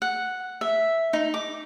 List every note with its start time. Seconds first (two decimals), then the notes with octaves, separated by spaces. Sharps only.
0.02 F#5
0.61 E5
1.13 D#4
1.34 D6